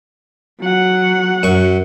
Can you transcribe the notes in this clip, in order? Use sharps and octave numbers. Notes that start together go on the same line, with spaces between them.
F#3 F#5
F#2 C#6